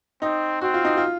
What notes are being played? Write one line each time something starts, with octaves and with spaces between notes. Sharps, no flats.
C4 D#4
C4 F#4
F4
D#4
F4